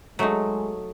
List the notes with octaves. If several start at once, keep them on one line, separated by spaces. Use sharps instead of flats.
F#3 G#3 A3 D#4